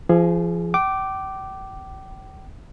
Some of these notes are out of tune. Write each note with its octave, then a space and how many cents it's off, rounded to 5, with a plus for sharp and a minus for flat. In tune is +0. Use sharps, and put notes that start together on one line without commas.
F3 -30 G#4 +5
G5 -35 D6 +0